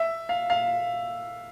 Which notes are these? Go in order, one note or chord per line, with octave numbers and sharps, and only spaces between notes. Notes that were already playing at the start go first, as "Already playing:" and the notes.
Already playing: E5
F5
F5